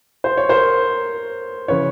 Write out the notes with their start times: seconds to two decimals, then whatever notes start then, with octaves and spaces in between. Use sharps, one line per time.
0.24 C5
0.37 C#5
0.49 A#4 C5
1.68 C#3 E3 B4 C#5